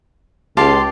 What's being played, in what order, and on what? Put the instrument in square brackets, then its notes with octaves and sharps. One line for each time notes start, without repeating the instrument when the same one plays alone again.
[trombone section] C#2 [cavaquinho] G4 F5 A5 [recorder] C6